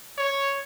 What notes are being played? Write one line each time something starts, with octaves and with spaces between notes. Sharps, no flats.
C#5